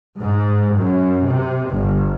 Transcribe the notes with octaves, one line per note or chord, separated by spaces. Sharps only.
G#2
F#2
C3
G1